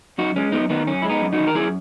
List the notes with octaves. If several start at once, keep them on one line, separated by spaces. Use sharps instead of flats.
F#2 D#4 F#4
G#3 C#4
F#2 B3 D#4
D#3 B3 D#4
F#2 C#4
G#3 E4
B3 D#4
F#2
D#4 F#4
D#3
A#4
F#2 E4 G#4